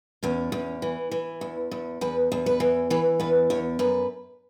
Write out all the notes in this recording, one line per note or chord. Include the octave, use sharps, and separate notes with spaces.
E2 C#4
E2
E3
E3
E2
E2
E2 B4
E2
B4
E3
E3 B4
E2 B4
E2 C#5
F#2 B4